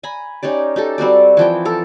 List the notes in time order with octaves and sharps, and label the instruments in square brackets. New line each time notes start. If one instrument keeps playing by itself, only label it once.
[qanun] G#5 A#5 B5
C#4 D#4 G4 D5
D#4 G4 A4
G3 C4 F#4 D5
E3 F3 G5
A4 A#4